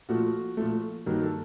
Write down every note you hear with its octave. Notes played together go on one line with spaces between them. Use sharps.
A#2 F3 A3 F#4
A#2 F3 A3
G2 D#3 F#3 A#3
A4